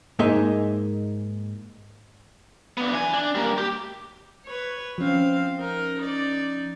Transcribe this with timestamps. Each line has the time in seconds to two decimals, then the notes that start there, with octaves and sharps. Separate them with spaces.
0.19 G#2 A#3 D#4 G#4 E5 C6
2.77 B3 D4
2.93 E3 G#5
3.14 D4
3.35 G3 A#3
3.58 G4
4.46 B4 C#5
4.98 F3 C4 C#4 F5
5.58 D#4 A#4
6.00 D#4 D5